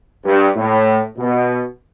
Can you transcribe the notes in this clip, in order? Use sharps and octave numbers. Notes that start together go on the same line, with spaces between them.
G2
A2
B2